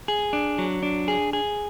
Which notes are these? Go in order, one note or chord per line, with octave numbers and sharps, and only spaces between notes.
G#4
D4
F#3
D4
G#4
G#4